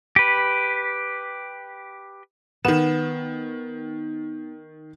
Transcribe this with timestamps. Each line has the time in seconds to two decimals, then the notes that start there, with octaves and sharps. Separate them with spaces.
0.16 G4 B4
2.65 D#3 B3 E7